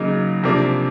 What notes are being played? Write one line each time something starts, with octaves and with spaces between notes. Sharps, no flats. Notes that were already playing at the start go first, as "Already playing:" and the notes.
Already playing: C#3 F#3 A#3 D#4
C3 F3 A#3 D4